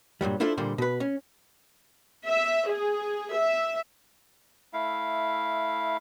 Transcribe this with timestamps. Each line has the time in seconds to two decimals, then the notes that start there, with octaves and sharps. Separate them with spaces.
0.21 G2 A#2 F#3 G3
0.40 D4 E4 F4 A4 C5
0.57 A#2 D3 G3 A#3 C5
0.78 B2 B4
1.00 C#4
2.26 E5
2.69 G#4
3.34 E5
4.73 A3 E4 F5